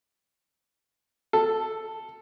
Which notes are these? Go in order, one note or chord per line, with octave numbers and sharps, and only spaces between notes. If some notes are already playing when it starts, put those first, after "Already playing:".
A4